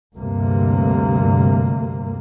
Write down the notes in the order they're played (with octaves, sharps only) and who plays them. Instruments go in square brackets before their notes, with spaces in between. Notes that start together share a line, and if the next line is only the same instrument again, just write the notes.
[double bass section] D2 G2 C3 A#3